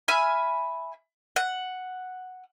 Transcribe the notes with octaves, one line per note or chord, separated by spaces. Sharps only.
E5 G#5 B5 F6
F#5